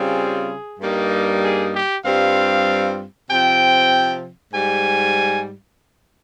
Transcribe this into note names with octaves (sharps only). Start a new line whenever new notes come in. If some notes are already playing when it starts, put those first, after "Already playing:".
Already playing: C#3 G3 C4 F4 G#4
G2 G3 A#3 D#4
G#4
G4
G2 G3 C4 F4 F5
C3 F3 C4 G5
G#2 G3 G#5